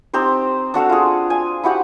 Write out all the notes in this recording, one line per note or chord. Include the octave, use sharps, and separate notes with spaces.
C4 D#4 G4 C5
D4 F#4 A4 F5
F4 G#4
G#5
E4 F#4 G4 F#5